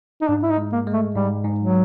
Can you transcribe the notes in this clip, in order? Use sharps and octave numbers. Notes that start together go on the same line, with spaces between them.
D#4
G#2 D4
E4
D#4
G#3
A#3
G#3
A3
G#2 G3
G#2
F#3